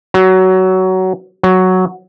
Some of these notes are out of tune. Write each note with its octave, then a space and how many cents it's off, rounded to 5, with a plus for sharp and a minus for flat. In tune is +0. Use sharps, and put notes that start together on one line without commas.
F#3 +15
F#3 +0